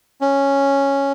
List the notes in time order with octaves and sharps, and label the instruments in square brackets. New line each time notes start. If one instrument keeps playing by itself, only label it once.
[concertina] C#4